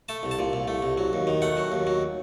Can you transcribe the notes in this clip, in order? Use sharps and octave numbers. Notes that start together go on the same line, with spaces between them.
A3 A5
C2
A5
A#2
C2
A3
C2
F#3
D#2
D#3
A3 F#5
F#3
D#2
F#3